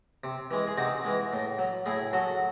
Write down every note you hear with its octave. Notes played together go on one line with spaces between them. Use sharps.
C3
E3 G#3
G#4
C3 D#4 F#4
E3 G#3
A2
F#3
A2 E4 G#4
F#3 F#4 A4